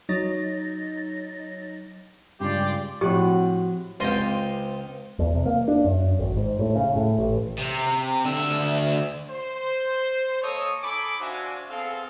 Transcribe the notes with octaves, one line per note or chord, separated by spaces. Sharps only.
F#3 D#4 C#5 D#5 A6 A#6
G2 C#3 G#3 F4 G4 D5
A2 F3 C4 F#4 G4 F#5
C#2 C4 F4 C5 D#5 G5
E2
C3
A#3
D4
F#2
G#1
G#2
A2
C#3
A2
A1
C3
D2 E5
C5
A#3 A4 C#5 D#5 D#6
D#4 A4 G#5 B5 D6
D4 F#4 C5 E5 F5 G#5
B3 C4 G#4 A4 F5